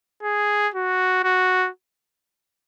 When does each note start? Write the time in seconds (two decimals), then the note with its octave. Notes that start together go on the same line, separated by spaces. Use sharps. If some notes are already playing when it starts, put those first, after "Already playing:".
0.23 G#4
0.74 F#4
1.24 F#4